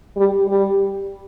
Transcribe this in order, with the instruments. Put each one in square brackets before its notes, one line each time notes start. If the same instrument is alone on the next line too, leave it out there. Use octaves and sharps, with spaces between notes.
[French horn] G3
G3